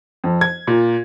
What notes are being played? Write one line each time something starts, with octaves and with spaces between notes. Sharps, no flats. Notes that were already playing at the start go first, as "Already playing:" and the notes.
F2
G#6
A#2